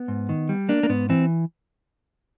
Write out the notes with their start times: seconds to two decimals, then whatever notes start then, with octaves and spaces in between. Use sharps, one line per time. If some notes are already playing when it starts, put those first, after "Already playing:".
Already playing: B3
0.08 G#2
0.29 D#3
0.49 G3
0.69 A#3 D4
0.83 A#3
0.89 G#2 B3
1.09 E3 C4